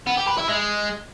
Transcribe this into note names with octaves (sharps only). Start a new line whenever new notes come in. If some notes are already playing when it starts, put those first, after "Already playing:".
B3
G4
B4
E4
G#3